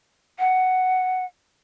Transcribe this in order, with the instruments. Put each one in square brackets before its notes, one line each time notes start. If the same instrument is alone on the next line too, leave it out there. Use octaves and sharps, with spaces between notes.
[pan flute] F#5